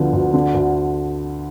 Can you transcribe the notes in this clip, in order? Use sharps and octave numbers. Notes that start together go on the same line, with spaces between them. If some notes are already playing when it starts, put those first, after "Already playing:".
Already playing: D2 D3 F3 B3
D2
D3
D2